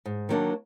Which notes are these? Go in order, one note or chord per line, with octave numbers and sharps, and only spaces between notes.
G#2
D#3 F#3 A#3 D4